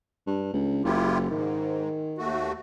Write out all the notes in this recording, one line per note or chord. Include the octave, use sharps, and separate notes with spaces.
G2
C#2
F#1 E4 F4 G4
G#2 D#3
D#2 A3 F#4